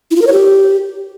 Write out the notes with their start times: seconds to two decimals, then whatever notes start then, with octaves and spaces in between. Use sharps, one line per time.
0.11 E4
0.16 F4
0.22 A#4
0.27 C#5
0.32 G4